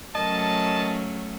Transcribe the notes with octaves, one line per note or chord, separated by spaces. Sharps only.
F#3 A3 C#4 A#4 D#5 A5